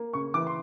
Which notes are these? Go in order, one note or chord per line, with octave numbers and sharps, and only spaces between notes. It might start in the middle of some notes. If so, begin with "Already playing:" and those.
Already playing: A#3
C#3 C#6
E3 D6
C6